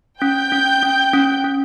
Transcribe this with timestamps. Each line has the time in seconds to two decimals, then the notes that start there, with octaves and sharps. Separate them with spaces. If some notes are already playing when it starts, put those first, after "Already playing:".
0.21 C#4 G5 G6
0.52 C#4
0.83 C#4
1.13 C#4
1.44 C#4